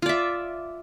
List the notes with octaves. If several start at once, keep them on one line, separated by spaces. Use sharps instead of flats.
F4 D5 E5